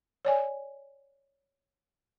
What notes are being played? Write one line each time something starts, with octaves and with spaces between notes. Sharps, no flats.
C#5 D5 G#5